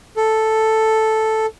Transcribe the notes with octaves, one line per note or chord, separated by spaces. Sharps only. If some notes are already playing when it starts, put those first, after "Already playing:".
A4